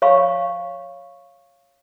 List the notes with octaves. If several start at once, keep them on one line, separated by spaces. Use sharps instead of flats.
C#5 F5 B5 C#6